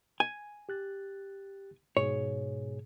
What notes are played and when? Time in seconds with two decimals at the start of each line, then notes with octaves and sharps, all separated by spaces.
0.20 G#5
0.69 G4 F#6 A6
1.97 G#2 B2 G#4 C#5